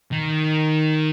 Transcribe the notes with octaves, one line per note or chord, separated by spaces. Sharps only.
D#3